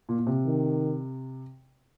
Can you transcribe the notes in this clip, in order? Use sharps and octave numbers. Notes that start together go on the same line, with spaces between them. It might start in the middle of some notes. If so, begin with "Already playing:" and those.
A#2
A#2
C3
D#3